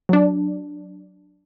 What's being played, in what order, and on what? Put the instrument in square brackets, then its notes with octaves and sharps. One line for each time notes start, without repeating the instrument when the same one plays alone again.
[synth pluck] F#3 D4